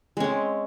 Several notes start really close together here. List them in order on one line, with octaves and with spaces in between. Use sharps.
G#3 C#4 C4